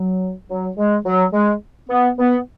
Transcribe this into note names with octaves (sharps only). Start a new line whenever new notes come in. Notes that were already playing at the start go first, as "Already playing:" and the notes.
Already playing: F#3
F#3
G#3
F#3
G#3
B3
B3